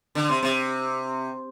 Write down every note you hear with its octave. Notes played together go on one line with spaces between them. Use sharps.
D3
C3
C3